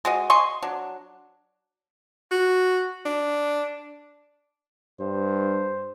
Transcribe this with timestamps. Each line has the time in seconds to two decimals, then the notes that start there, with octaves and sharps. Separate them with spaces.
0.05 G#3 F#4 D#5
0.30 D#5 G#5 C6 C#6
0.62 F#3 D4
2.31 F#4
3.05 D4
5.00 G2 C5